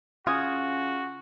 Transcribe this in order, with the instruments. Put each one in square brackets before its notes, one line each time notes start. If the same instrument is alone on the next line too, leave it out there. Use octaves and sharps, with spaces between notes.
[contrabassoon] C#3 [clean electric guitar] F4 [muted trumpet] F#4 [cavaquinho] G#5 D#6